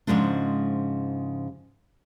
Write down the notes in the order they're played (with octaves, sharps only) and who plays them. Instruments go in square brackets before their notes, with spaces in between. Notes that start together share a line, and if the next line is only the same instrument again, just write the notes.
[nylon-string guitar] G#2 C#3 F3 G#3 D4